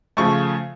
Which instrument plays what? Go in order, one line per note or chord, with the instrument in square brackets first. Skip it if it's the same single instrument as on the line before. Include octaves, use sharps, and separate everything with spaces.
[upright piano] C#3 F3 A3 C#6